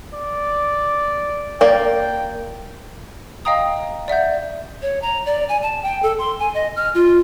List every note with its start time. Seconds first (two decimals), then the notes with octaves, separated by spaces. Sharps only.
0.14 D5
1.61 A#3 D5 G5
3.45 D#5 F5 G5 A#5 D#6
4.08 D5 E5 F#5 G6
4.82 C#5
5.02 A#5
5.26 D5
5.49 G#5
5.62 A5
5.83 G5
6.03 A4
6.19 C6
6.39 G#5
6.54 D#5
6.76 F6
6.95 F4